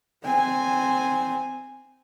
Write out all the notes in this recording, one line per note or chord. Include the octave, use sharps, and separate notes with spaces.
C4 G#5